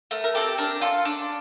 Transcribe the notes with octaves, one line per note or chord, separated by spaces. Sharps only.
A3 A#4
A#4
C4 G4 A4
D4 A#4
F4 A4
D4